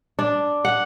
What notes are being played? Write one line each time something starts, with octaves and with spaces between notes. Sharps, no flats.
D4
F#5